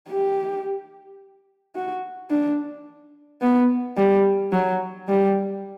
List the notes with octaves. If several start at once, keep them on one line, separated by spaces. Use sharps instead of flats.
G4
F#4
D4
B3
G3
F#3
G3